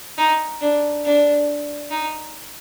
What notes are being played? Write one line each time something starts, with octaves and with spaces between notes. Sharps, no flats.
D#4
D4
D4
D#4